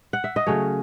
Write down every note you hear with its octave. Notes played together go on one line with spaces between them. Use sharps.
F#5
E5
D#5
C#3 F#3 A3 C#4 C#5